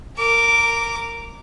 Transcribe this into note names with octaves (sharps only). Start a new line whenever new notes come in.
A#4 D6